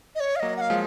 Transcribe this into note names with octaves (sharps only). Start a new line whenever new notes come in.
D#5
C#5
F5
F#3 A#3 D#5
F#5
F5
F3 G#3